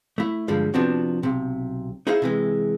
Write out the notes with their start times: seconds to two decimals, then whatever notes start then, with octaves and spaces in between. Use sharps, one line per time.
0.18 A3 E4
0.48 G2 D3 F3 G3 G#3
0.74 C3 F3 B3 C4 D4 F#4
1.23 B1 C3
2.07 D#4 E4 G#4 C5 F5
2.22 C3 E3 G#3